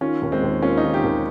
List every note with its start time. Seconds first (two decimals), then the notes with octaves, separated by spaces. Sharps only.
0.01 D#3 C#4 F4
0.22 D#2
0.32 G#3 C4
0.42 D#2
0.62 A#3 C#4 F4
0.77 D#4
0.83 D#3 F4
0.94 D#4 G4
1.03 D#2